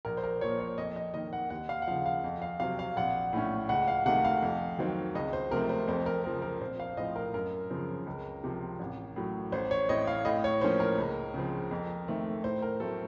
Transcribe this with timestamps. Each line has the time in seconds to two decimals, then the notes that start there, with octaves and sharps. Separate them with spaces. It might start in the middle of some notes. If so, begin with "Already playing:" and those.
0.05 A#1 A#4
0.17 C5
0.24 A#4
0.41 A#2 F3 C#5
0.60 C#5
0.78 F2 D#5
0.96 D#5
1.14 D#3 A#3 D#5
1.33 F#5
1.50 D#2 F#5
1.69 F5
1.82 F#5
1.87 C#3 F3 F5
2.06 F5
2.24 F2
2.42 F5
2.60 C3 F#3 C4 F5
2.79 F5
2.96 A#1 F#5
3.33 A2 A3 C#4
3.69 C#2 F#5
3.88 F5
4.06 C3 D#3 A3 F#5
4.25 F5
4.42 F2
4.79 D#3 F#3 C4
5.15 C#2 D#5
5.33 C5
5.51 C3 F3 A3 C4 A#4
5.69 C5
5.88 F2 C5
6.06 A#4
6.24 C#3 F3 C4 A#4
6.42 A#4
6.61 A#1 C5
6.80 F5
6.97 A2 F3 C4 D#5
7.16 A#4
7.34 F#2 A#4
7.70 C#3 F3 C4
8.07 C#2
8.44 C3 F3
8.79 A1
9.16 A2 F#3
9.52 A1 C5
9.71 C#5
9.89 A2 A3 C4 D#5
10.07 F5
10.25 A2 D#5
10.44 C#5
10.61 F3 A#3 C#4 C5
10.80 A#4
10.98 C#2
11.34 C#3 F3 C4
11.71 F2
12.08 D#3 A3 C4
12.43 A2 C5
12.62 A#4
12.80 F#3 A3 C4 A4